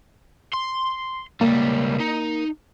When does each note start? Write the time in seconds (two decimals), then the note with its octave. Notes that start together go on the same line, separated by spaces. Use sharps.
0.53 C6
1.41 C#2 G3 A#3
2.01 D#4